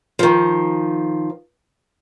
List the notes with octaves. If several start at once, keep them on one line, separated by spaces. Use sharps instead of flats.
D#3 F3